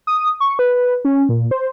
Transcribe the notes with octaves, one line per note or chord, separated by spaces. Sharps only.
D#6
C#6
B4
C#4
A#2
C5